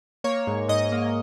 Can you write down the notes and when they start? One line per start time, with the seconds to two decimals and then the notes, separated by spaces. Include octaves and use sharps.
0.24 A#3 C#5
0.47 G#2
0.69 G#2 D#5
0.92 A#3